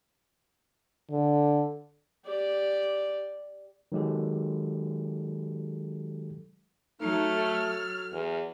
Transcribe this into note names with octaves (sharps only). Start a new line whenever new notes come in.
D3
G4 D5
D#3 F#3 G#3 G4 A4
F#3 A3 D#4 F6
A4
E2